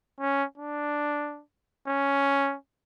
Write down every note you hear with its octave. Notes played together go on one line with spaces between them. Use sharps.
C#4
D4
C#4